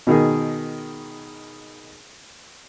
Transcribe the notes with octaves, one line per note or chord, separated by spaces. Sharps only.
B2 D#3 G#4